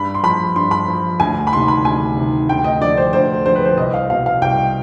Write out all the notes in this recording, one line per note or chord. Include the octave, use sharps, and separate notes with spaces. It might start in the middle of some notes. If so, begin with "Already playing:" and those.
Already playing: G2 B5
C6
F3 B5
G2 C6
B5
F3
D2 G#5
B5
C3 D#3 C6
B5
D2 G#5
C3 D#3
D2 G5
D#5
D3 F3 D5
C5
D2 C5
D3 F3 C5
B4
C5
C2 D#5
F5
B2 F5
F5
C2 G5